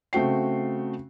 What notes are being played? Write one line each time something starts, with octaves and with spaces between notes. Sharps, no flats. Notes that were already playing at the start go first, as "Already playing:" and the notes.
C#3 A3 C4 F#4 G5 C7